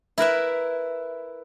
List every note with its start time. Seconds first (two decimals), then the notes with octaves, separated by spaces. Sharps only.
0.18 E4 A#4 B4 E5